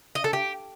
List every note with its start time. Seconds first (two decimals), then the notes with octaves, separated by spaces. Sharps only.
0.15 D#5
0.24 A4
0.33 G4